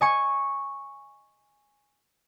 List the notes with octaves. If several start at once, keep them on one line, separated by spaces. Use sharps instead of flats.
D#5 G#5 C#6